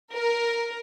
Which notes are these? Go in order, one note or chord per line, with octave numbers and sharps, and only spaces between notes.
A#4